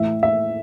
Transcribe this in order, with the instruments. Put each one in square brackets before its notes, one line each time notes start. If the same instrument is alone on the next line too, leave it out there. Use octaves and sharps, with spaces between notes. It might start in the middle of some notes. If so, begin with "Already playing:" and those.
Already playing: [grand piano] A2 E3 E5
E5